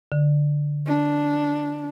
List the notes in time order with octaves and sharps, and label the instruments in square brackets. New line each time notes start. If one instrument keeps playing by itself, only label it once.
[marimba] D3
[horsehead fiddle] D4